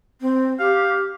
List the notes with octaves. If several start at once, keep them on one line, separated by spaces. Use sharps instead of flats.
C4
G4 F5